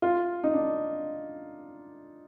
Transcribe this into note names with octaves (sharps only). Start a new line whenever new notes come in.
F4
D#4
D4